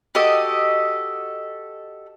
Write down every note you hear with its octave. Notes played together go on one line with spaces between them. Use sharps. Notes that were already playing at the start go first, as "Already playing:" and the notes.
F#4 G4 A4 D#5